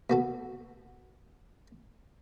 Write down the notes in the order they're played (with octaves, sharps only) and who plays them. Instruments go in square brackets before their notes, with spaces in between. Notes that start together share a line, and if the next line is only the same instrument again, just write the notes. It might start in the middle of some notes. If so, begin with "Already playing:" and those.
[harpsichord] B2 F#4 A4